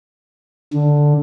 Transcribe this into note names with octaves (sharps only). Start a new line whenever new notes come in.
D3